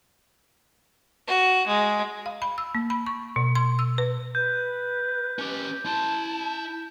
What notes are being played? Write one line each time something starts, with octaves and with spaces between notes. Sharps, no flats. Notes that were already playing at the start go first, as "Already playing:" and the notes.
F#4
G#3
F5
B5
E6
A#3
B5
C#6
B2
C6
E6
B4
B4 G6
C#4 G4
E4 A5 C6